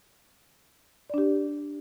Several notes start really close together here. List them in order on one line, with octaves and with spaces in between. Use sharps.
D5 D4 G4